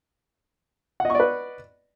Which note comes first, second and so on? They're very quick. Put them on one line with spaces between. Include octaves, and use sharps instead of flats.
F#5 D#5 C#6 D5 B4